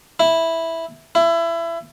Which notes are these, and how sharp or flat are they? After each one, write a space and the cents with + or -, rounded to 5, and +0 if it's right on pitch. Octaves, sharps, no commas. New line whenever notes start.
E4 -5
E4 +25